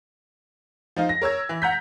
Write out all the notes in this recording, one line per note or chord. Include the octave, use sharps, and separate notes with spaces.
F3 D#4 F4
A#6
A#4 C#5 E6 G#6
E3
F#5 A#5 G6 B6